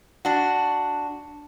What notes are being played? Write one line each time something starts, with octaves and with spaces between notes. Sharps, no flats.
D4 F#4